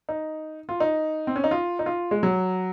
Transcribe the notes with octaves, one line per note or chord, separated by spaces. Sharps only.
D#4
F4
D#4
C4
C#4
D#4
F4
D#4
F4
G#3
F#3